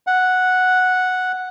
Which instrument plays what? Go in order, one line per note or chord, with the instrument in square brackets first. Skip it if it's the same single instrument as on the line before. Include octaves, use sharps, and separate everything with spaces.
[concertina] F#5